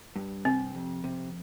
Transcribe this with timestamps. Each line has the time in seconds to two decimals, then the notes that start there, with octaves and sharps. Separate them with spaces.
0.16 G2
0.45 C3 C4
0.75 F2
1.04 C3